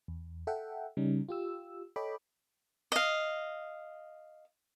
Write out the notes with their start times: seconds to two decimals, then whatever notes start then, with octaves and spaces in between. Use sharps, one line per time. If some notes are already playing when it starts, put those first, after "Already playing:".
0.08 E2
0.47 A4 E5 F#5 G5
0.97 C#3 G3 C#4 D#4
1.29 F4 G4 E6
1.96 A4 C#5 D#5 G5 B5 D6
2.92 D#5 F5